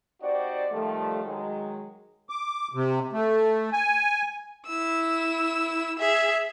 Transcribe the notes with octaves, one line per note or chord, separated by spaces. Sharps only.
C4 D#4 F#4 G4 C5 D5
D#3 F3 G3 A3
D#3 F#3 G#3
D6
C3
A3
G#5
E4 E6
G#4 E5